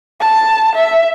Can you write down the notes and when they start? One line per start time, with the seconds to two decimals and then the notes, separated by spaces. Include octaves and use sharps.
0.21 A5
0.75 E5